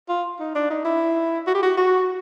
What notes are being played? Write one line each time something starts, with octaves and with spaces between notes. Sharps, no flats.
F4
D#4
D4
D#4
E4
F#4
G4
F#4
F#4